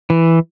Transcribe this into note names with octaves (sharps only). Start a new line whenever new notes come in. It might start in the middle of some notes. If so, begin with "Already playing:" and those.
E3